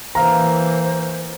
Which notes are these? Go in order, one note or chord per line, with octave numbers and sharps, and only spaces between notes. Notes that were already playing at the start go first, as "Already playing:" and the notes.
E3 A#3 C5 F5 A#5